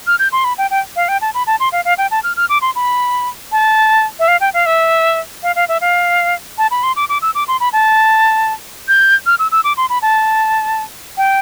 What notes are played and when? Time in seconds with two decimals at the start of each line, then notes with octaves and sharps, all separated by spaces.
0.07 F6
0.19 G6
0.32 C6
0.44 B5
0.58 G5
0.71 G5
0.96 F5
1.09 G5
1.21 A5
1.34 B5
1.47 A5
1.60 C6
1.72 F5
1.85 F5
1.98 G5
2.11 A5
2.24 F6
2.37 F6
2.49 D6
2.62 C6
2.75 B5
3.52 A5
4.19 E5
4.28 F5
4.41 G5
4.54 F5
4.66 E5
5.43 F5
5.56 F5
5.69 E5
5.81 F5
6.58 A5
6.71 B5
6.83 C6
6.96 D6
7.09 D6
7.22 E6
7.35 D6
7.48 C6
7.60 B5
7.73 A5
8.88 G6
9.26 F6
9.39 E6
9.52 E6
9.64 D6
9.77 C6
9.90 B5
10.02 A5
11.17 G5